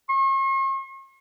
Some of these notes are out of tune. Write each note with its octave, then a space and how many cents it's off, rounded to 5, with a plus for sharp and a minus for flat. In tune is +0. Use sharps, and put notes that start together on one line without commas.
C#6 -45